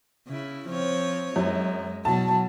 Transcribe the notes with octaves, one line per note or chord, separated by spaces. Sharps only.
C#3 E4
F3 C4 C#5
F#2 G#3
B2 F#3 A5